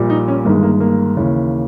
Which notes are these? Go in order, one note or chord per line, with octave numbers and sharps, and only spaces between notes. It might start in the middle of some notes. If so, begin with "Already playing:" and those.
Already playing: A#1 A#2 G3
D#4
C#4
G1 G2 D#3 G#3 A#3
A#3
A#3
D#2 C#3 E3